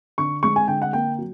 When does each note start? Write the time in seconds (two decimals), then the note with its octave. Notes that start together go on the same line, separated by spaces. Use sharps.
0.18 D3 C#6
0.43 G#3 C#6
0.56 G#5
0.68 D3 G5
0.82 F#5
0.93 A#3 G5
1.19 F#3